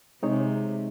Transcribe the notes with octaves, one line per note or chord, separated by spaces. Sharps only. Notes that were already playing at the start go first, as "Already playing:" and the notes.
C3 G#3 C4 D#4 G#4 C#5